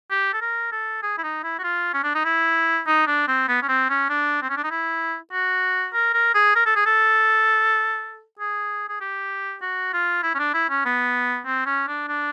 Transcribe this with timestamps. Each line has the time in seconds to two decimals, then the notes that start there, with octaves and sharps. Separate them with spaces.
0.10 G4
0.33 A4
0.41 A#4
0.72 A4
1.02 G#4
1.18 E4
1.23 D#4
1.44 E4
1.59 F#4
1.63 F4
1.93 C#4
2.03 D4
2.15 D#4
2.25 E4
2.87 D#4
3.07 D4
3.28 C4
3.48 B3
3.62 C#4
3.68 C4
3.89 C#4
4.09 D4
4.42 C4
4.50 C#4
4.57 D4
4.64 D#4
4.70 E4
5.32 F#4
5.93 A#4
6.14 A#4
6.34 G#4
6.55 A#4
6.66 A4
6.76 G#4
6.86 A4
8.39 G#4
8.89 G#4
9.01 G4
9.62 F#4
9.93 F4
10.23 E4
10.35 C#4
10.38 D4
10.54 E4
10.69 C#4
10.85 B3
11.45 C4
11.66 C#4
11.87 D4
12.08 D4